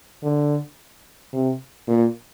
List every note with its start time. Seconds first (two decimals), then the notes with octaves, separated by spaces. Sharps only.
0.23 D3
1.33 C3
1.88 A#2